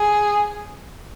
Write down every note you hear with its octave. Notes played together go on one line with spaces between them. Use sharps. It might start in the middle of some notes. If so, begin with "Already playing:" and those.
Already playing: G#4